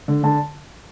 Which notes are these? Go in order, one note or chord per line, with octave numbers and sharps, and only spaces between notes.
D3
D3 A5